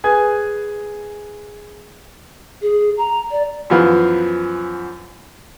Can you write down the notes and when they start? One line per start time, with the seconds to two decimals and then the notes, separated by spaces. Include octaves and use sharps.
0.04 G#4 B4 G#5 G#6
2.61 G#4
2.97 A#5
3.31 D5
3.70 F#2 E3 F3 B3 F5